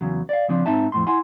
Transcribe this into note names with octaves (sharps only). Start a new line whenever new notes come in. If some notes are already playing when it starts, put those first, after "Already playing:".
E2 C#3 F#3
D5 F5
C#3 F3 C4 D4
G#2 C4 D#4 E5 A5
F2 A2 C6
E4 F#5 G#5 C6